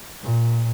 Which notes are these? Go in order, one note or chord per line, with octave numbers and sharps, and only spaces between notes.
A#2